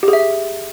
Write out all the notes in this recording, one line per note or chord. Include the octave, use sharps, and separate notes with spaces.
G4
G#4
E5